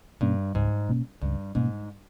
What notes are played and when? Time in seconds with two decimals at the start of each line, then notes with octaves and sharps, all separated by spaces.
0.21 G2 B2 A#3 C#4
0.55 C#2 G#2
0.89 B2 A#3 C#4
1.22 C#2 G2
1.55 G#2 B2 A#3 C#4